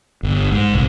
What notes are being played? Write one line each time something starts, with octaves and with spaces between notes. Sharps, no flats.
G1
G#2
C2